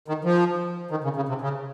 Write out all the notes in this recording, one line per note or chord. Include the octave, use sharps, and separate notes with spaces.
D#3
F3
D#3
C#3
C#3
C3
C#3